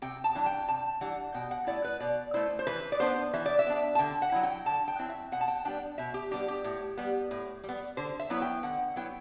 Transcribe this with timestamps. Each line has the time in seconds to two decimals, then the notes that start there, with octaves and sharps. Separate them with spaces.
0.02 C3 G5
0.24 A5
0.35 E3 G3 D4
0.46 G5
0.68 C3 A5
1.01 E3 G3 D4 F#5
1.34 B2 G5
1.51 F#5
1.67 A3 E4 D5
1.84 B4
2.00 B2 D5
2.34 A3 E4 C5
2.59 C5
2.67 E3 B4
2.92 D5
3.00 B3 D4 C5
3.33 E3 E5
3.46 D5
3.59 E5
3.66 B3 D4
3.95 A5
3.99 D3 G5
4.22 F#5
4.32 F#3 C4 E4
4.43 G5
4.66 D3 A5
4.88 G5
4.98 F#3 C4 E4
5.10 E5
5.32 B2 F#5
5.41 A5
5.48 G5
5.65 G3 B3 D4 G5
5.98 B2 E5
6.14 G4
6.31 G3 B3 D4 G4
6.48 G4
6.64 A2
6.97 G3 B3
7.31 A2
7.64 G3
7.69 B3
7.97 D3 C5
8.20 E5
8.30 F#3 B3 E4
8.42 G5
8.63 D3 F#5
8.96 F#3 B3 E4 G5